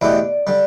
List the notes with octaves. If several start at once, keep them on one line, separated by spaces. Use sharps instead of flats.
E2 B2 A3 E4 G4 D5
D3 G3